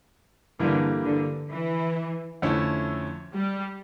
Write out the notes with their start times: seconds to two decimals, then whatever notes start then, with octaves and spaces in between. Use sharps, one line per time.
0.59 G2 D3 E3 G3 A#3
1.05 D3
1.50 E3
2.42 F2 D3 A3 C#4 E4
3.33 G3